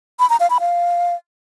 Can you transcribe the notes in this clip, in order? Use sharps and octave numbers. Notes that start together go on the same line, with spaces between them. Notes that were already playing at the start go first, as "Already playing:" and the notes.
B5
A#5
F5
B5
F5